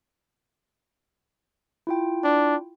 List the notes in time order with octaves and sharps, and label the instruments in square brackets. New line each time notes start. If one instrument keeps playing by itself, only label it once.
[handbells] E4 F4 G5
[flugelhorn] D4